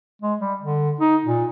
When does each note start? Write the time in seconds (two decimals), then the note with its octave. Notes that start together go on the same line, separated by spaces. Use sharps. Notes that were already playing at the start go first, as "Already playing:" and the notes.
0.22 G#3
0.40 G3
0.61 D3
1.00 D#4
1.25 A#2